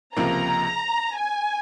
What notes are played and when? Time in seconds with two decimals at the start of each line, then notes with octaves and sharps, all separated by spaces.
0.16 C#2 C3 F3 A#3 A#5
1.16 G#5